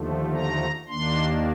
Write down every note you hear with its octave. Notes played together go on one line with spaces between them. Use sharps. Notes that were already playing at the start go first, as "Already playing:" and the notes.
Already playing: D#2 D3 F3 A3
A#5
D#2 D#3 A#3 D4 C6